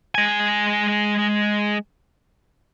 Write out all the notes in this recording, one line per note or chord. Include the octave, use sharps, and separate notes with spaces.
G#3 G#5